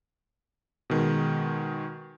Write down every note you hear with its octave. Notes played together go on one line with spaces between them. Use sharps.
B2 D#3 G#3